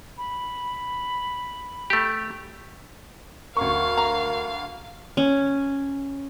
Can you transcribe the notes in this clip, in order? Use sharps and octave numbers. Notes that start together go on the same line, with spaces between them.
B5
A3 G4
D2 A#4 F5 C#6
A#5
C#4